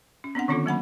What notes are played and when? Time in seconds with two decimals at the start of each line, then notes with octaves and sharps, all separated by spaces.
0.24 C#4
0.35 B3 C4 D4 F#5
0.48 D3 D#3 B3 C#4 F4 A4
0.66 F#3 A#3 F#5 B5